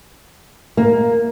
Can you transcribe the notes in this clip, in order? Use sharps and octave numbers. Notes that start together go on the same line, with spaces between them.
A#3